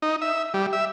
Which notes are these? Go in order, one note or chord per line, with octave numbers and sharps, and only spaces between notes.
D#4
E5
G3
E5